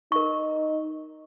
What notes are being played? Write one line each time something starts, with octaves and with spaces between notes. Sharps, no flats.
D#4 A#4 C#6